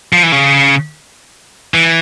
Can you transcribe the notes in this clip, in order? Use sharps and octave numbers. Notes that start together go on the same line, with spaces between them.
F3
E3
C#3
E3